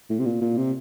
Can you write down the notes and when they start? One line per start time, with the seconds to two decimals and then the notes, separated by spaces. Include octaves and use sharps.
0.10 A2
0.19 C3
0.25 A#2
0.41 A#2
0.57 C3